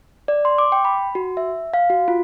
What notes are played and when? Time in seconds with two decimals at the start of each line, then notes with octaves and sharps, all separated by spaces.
0.28 D5
0.45 C6
0.58 D6
0.72 G5
0.85 B5
1.15 F#4
1.37 E5
1.74 F5
1.90 F#4
2.08 F4